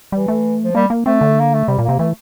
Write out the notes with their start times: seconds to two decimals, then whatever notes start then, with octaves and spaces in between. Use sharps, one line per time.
0.12 E3 G3
0.28 A3
0.63 F3
0.75 G3 A#3
0.90 A#3
1.06 A3 C4
1.21 D3
1.40 A#3
1.54 A3
1.68 C3 G3
1.79 A#2
1.84 C3 A#3
1.99 E3 A3